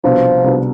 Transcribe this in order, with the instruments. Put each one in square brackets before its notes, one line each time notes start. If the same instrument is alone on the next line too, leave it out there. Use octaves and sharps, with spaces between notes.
[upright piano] C2 B2 B3 D4 [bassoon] F3
[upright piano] C2 B2 B3 D4